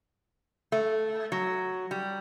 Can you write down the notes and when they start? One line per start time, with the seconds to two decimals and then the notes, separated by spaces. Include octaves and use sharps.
0.72 A3
1.32 F#3
1.91 G3